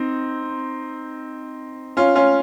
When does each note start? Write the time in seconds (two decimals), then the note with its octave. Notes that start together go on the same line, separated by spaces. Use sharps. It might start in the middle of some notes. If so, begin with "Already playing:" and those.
Already playing: C4 D#4
1.97 C#4 F4
2.15 C#4 F4